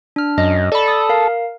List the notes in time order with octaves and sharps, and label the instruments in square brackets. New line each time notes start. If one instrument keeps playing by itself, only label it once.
[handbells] D4 F6
[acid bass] F#2 [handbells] D#5
[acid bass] A4 [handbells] D5 B5
[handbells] D#6
A#4 F5